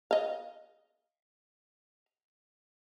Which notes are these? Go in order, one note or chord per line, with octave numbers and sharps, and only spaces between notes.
D#5 F5